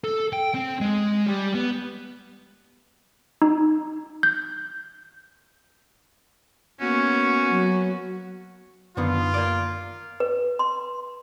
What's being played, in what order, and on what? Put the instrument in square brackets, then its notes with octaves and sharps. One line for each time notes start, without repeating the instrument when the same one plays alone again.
[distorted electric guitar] A4
G5
C4
G#3
G3
B3
[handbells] D#4
G6
[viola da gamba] A#3 B3 F#4 [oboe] C#4
[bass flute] F#3
[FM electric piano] F#2 [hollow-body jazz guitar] D3 D#3 B3 [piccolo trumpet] F4
[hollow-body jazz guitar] A#3 D5
[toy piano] B4
C6